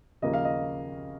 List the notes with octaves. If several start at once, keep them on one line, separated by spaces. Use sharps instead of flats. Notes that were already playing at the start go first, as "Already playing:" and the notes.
D#2 C#3 F3 A#3 D#5
F5
D#5